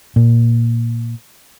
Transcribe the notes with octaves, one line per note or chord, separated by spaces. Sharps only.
A#2